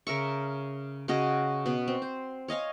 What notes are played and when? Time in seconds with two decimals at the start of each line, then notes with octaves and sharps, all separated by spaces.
0.07 C#3 A#4 E5 C#6
1.08 C#3 C#4 F#4 D#5
1.66 B2 B3
1.88 C4
2.02 C5
2.48 C#5 D#5 F5 G#5